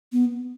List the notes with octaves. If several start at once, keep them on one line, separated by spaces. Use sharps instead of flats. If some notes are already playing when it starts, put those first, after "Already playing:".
B3